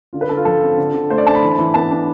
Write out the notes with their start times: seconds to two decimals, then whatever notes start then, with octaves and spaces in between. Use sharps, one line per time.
0.13 D3 F4
0.21 B4
0.29 D3 A4
0.37 F4
0.45 F3 A4
0.62 C4
0.77 D3
0.94 D3
1.10 A3 C5
1.18 D5
1.27 D4 A5
1.35 B5
1.43 E3
1.59 E3
1.74 B3 A5
1.91 D4